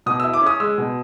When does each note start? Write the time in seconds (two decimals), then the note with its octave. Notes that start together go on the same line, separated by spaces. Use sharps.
0.06 B2 D#6
0.20 E6
0.24 E4
0.34 D6
0.42 C#4 D#6
0.60 G#3 E6
0.78 B2